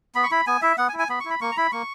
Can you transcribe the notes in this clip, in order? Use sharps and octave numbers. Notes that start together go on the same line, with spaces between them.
B3 B5
C#6
E4 B5
B3 G#5
E4 E5
B3 F#5
G#5
E4
G#5
B3 B5
C#6
E4
B5
A#3 C#6
A#5
E4 B5
A#3 C#6